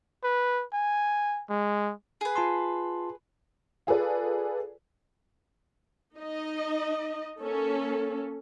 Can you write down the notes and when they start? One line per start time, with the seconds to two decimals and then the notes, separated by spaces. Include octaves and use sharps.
0.24 B4
0.73 G#5
1.50 G#3
2.21 G#4 B4
2.36 F4 A5 C6
3.87 F4 G#4 A4 B4 D5
6.16 D#4 D#5
7.41 A#3 C#4 A4